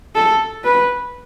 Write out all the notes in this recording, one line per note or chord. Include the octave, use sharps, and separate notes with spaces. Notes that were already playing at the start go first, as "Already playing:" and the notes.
A4
B4